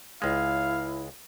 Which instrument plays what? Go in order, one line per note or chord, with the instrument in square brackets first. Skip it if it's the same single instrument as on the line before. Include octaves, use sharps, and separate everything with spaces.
[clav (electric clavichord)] C#2 G#3 [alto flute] E4 [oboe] F5